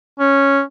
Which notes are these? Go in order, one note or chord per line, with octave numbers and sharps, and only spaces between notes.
C#4